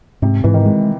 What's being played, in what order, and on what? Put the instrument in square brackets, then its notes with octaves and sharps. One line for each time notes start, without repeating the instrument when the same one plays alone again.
[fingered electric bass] G#2 [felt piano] C3
[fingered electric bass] G#2 [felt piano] E3
[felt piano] D#3
[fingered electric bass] G#3